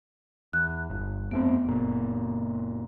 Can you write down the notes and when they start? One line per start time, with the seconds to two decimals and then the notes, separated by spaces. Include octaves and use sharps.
0.53 E2 F#6
0.90 G1
1.31 F2 A3 B3 C4
1.65 F#1 A#2